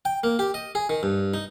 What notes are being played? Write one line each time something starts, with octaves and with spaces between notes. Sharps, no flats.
G5
A#3
G4
D#5
G#4
D#3
G2
D#4